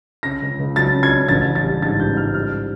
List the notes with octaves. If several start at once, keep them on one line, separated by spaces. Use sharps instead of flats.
C#3 A#6
C#2
C#2
F#3 A6
C#3
G#6
C#3
A1 A6
A1
A6
G3
G#2 A6
A1 G6
G#2 F6
G3 F6